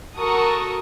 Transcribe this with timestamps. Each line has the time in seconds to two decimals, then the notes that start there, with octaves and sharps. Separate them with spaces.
0.18 F#4 A4 A#4 C#6 D#6